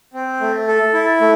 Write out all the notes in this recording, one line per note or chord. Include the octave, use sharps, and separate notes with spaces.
C4
A3
A4
E4
A3